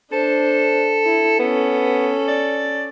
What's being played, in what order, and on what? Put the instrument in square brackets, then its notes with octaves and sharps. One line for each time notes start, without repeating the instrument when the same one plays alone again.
[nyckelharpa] D4 C5 [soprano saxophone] A4
[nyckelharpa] E4
[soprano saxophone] B3 [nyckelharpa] C#4 A4
[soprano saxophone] D5